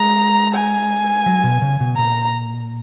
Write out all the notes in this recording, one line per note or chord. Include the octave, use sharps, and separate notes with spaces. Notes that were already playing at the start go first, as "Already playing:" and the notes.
Already playing: G#3 A#5
G#5
F#3
B2
C#3
B2
A#2 A#5